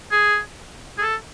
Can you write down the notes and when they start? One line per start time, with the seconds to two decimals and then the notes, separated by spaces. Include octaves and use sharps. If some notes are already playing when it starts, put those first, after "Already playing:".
0.12 G#4
0.98 G#4
1.02 A4